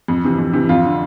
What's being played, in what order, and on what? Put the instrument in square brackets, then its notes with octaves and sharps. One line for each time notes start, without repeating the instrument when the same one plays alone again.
[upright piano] F2
C3 E3
F2
C3 E3
F2 F4
D3